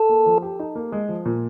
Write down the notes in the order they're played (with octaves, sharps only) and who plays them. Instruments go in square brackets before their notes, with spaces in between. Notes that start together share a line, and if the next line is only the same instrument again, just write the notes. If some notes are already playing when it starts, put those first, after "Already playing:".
Already playing: [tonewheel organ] A4
[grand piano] A#3
F3
G4
D#4
A#3
G#3
F3
A#2